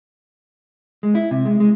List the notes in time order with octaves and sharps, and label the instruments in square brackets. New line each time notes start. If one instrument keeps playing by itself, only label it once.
[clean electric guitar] G#3
E4
C3
G#3
G#3